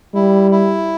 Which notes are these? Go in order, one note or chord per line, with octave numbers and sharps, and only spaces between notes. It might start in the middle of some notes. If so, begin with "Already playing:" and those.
G3 E4
E4